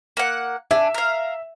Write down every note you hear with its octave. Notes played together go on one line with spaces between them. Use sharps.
A#3 F#5
D4 E5 G#5
A#4 F5